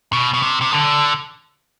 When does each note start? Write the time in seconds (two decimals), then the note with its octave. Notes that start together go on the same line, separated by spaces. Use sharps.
0.13 B2
0.34 B2
0.42 C3
0.61 C3
0.71 D3